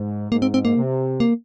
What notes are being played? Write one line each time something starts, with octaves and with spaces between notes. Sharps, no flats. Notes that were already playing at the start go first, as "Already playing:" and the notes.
Already playing: G#2
G#2 A#3
C4
C4
A#3
C3
A#3